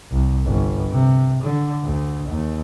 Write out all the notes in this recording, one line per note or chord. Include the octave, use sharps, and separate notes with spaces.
C2
G1
C3
D3
D2
D#2